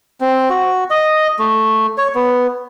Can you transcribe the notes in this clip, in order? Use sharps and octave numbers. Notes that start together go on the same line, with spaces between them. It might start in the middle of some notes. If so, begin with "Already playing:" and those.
C4
F#4
D#5
A3
C#5
B3